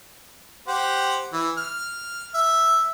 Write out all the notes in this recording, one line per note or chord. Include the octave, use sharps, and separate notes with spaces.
G4 C5 F#5
E3
F6
E5